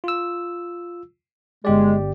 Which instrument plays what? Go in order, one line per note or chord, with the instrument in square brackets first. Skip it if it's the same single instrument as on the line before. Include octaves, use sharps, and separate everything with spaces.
[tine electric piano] F4 E6
[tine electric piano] G1 G4 D5 [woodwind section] G#3